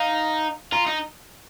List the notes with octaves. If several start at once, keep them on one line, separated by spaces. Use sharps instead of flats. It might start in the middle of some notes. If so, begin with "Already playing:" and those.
Already playing: D#4 F5
F4 A#5
D#4